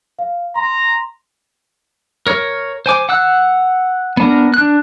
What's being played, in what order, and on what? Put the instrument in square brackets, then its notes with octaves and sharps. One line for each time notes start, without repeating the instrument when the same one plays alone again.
[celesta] F5
[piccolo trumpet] A#5 [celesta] C6
[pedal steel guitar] A#4 C#5
C5 G#5 D6
F#5 E6 F#6
B3 D4 A#4
D4 F#6